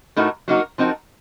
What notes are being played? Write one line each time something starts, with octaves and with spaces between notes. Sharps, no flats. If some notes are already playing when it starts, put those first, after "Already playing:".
A2 A3 D#4 F#4 A#4
F#3 A#3 D#4 F#4 A#4
F3 C4 D#4 F#4 A#4